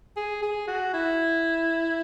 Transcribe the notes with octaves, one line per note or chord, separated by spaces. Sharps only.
G#4
G#4
F#4
E4